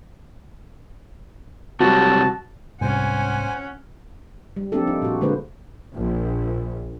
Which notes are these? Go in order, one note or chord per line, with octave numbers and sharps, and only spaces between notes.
C3 F#3 G3 F#4 A5
C2 G#2 B3 C#4 C5 F#5 G#5
G3
F3 A#3 C4 D4 G4 A4
D#4
A#2 F#4
D3 G#3 A#3 D4 B4 C5
A#1